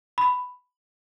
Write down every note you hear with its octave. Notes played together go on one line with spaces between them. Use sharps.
B5